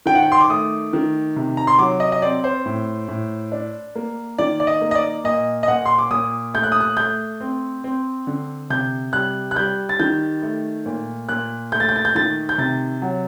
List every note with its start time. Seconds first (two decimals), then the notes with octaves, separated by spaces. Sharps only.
0.06 D#3 G5
0.15 F#5
0.23 G5
0.32 C6
0.41 D6
0.49 A3 D#6
0.93 D#3
1.36 C3
1.57 A#5
1.67 C6
1.79 F#3 D6
2.00 D#5
2.12 D#5
2.22 C4 D5
2.44 C5
2.66 A2
3.08 A2
3.52 D4
3.95 A#3
4.38 D#3 D5
4.60 D5
4.67 D#5
4.81 A#3
4.91 D#5
4.95 D5
5.24 A#2 D#5
5.63 D#5
5.68 A#2 F#5
5.86 C6
5.99 D6
6.10 A#2 D#6
6.54 A3 G6
6.63 F#6
6.72 D#6
6.80 F#6
6.97 A3 G6
7.41 C4
7.84 C4
8.27 D3
8.70 C3 G6
9.13 G3 F#6
9.51 F#6
9.56 G3 G6
9.89 A6
9.99 D#3 G6
10.43 A3
10.86 A#2
11.29 A#2 F#6
11.72 A3 G6
11.80 A6
11.89 G6
11.96 A6
12.05 G6
12.15 D#3 A6
12.49 G6
12.58 C3 A6
13.02 F#3